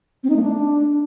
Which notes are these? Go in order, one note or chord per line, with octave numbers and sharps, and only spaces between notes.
C4
D#4
A3
D4